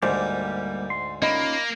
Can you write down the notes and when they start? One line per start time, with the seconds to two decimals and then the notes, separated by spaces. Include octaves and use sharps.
0.03 D2 G#2 G3 A#3 G4 C5
0.90 C6
1.22 A#3 C#4 D#4 F4 D#5 B5